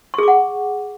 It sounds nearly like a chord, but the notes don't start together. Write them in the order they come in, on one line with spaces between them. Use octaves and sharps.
C#6 G#4 D6 F#5